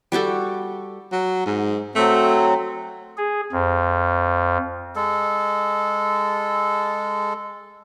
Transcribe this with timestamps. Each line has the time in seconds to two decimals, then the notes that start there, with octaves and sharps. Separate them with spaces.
0.12 G3 F#4 G4 A4
1.12 F#3
1.46 G#2
1.95 F#3 A3 C4
3.17 G#4
3.52 F2
4.96 G#3 A4